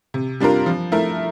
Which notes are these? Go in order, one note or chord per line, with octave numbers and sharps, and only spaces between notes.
C3
G3 D4 F4 A#4
F3
A3 E4 A#4